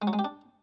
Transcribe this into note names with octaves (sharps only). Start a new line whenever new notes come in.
G#3
F#3
G#3
G4
D4